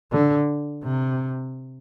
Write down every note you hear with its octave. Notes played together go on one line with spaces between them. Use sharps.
D3
C3